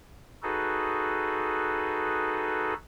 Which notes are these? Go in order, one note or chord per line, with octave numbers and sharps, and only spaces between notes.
D#4 F#4 G#4 A4 B4